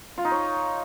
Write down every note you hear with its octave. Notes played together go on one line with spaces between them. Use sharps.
F4
D#4
C#5